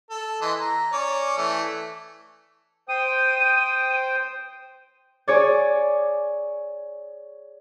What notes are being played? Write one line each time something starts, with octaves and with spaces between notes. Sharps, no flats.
A4
E3 D#5 C6
A#5
C#4 C#5 D5
E3 A3
C5 G5 D#6 D#7
G#4 C#5 D5